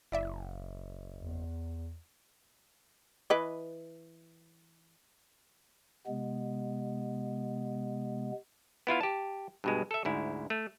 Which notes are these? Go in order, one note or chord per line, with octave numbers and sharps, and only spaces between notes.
F#1 E4 D5 E5
E2
E3 B4 D#5
C3 G#3 B3
B3 E4 F4 F5
G4 A5
G2 B2 G#3
A4 E5
D2 G#2 E4
A3